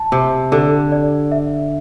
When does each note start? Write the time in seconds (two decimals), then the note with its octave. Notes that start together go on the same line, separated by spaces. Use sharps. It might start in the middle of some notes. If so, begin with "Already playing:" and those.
Already playing: A5
0.12 C3 G4
0.52 D3 G4
0.92 D5
1.32 E5